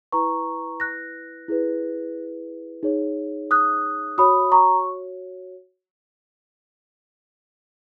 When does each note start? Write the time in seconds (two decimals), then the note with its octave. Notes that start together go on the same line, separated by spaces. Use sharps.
0.12 E4 B4 A#5 C#6
0.80 F#6 A#6
1.48 E4 G#4 B4
2.83 D#4 G#4 C#5
3.51 D#6 F#6
4.18 F#4 C#5 B5 D#6
4.52 A#5 C#6